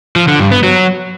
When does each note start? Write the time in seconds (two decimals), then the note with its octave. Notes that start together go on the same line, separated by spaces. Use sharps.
0.16 F3
0.28 D3
0.40 G2
0.51 B3
0.63 F#3